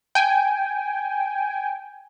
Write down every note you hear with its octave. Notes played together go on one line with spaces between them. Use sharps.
G5 G#5